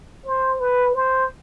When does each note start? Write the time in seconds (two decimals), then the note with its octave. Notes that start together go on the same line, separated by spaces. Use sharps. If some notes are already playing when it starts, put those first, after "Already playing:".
0.26 C5
0.60 B4
0.95 C5